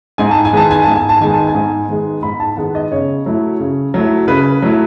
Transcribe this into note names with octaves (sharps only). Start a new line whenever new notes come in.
G#2 G#5
A5
G#5
D#3 G#3 B3 A5
G#5
G#2 A5
G#5
A5
D#3 G#3 B3 G#5
A5
G#5
G#2
D#3 G#3 B3
G#2 B5
A5
D#3 G#3 B3 F#5
D#5
C#3 C#5
F#3 A3 E4
C#3
F#3 A3 E4
C#3 B4
F#3 A3 E4